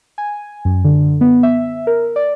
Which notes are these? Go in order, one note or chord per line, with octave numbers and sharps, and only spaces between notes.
G#5
F#2
D3
B3
E5
A#4
D5